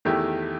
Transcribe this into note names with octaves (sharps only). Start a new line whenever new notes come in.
E2 D#3 A3 E4 G4